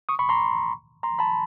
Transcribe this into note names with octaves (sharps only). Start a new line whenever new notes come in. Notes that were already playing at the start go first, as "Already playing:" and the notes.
C#6 D#6
B5 C#6
A#5 C6
A#5 C6
A5 B5